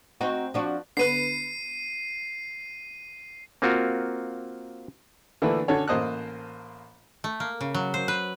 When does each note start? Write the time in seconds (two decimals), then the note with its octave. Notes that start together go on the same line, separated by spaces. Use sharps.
0.21 C4 D#4 F#4
0.54 F3 D4 F#4
0.97 D3 B3 B4 C7 D#7
3.62 A#3 C4 F4 F#4 A#4
5.42 D3 E3 A3 A#3 D4 B4
5.68 D3 C#4 F#4 A4 C#5
5.88 A1 A#3 C5 D#5 A5 F#6
7.24 A3
7.40 A#3
7.61 C#3
7.74 F#3
7.94 C5
8.08 B4